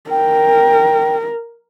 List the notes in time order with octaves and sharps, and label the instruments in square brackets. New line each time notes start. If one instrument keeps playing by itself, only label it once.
[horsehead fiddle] A#4 [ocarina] G5